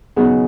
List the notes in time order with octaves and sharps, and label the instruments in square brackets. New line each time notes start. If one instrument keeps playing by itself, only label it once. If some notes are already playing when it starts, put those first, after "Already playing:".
[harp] C#3 F#3 B3 D#4 F#4 [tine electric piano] G#4